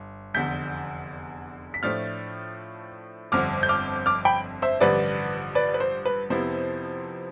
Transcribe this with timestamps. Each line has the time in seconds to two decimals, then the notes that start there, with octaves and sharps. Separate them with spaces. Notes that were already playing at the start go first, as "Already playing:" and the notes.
Already playing: G1
0.34 F1 E2 D3 G6 B6
1.74 B6
1.83 A2 F3 A3 D4 F6 A6
3.32 G1 F2 D3 D6 F6
3.63 G6
3.69 D6 F6
4.06 D6 F6
4.25 G5 B5
4.62 C5 E5
4.80 A1 G2 D3 F3 B4 D5
5.55 B4 D5
5.74 B4
5.80 C5
6.06 B4
6.30 F2 C3 F3 B3 E4 C5